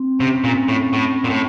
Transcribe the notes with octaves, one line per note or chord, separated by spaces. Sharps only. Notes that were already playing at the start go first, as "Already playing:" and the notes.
Already playing: C4
C3 C#4
A#2
A2
A2
A#2
A2